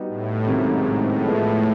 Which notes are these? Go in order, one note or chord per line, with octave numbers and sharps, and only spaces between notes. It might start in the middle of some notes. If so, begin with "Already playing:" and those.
Already playing: G3 B3 D#4 F#4
A2
G#2 C3 D#3 F#3 A#3 C#4
A2
F3 G#3 B3 E4